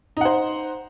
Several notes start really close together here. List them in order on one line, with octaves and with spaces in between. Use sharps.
D#4 F#5 C5